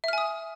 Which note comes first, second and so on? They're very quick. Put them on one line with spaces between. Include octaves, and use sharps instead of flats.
E5 F6 G#5 D#6